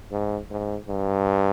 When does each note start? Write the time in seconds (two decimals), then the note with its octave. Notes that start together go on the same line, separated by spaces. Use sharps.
0.12 G#2
0.51 G#2
0.88 G2